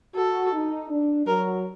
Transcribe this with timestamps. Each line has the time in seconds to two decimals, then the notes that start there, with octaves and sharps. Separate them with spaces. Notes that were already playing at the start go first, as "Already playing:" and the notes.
0.15 F#4 A4
0.53 D#4
0.89 D4
1.27 F#3 A#4